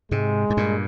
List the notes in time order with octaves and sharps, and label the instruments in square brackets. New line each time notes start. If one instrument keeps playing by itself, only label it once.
[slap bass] G#2 C3 [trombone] G#3
[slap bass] G#2
G2 A#2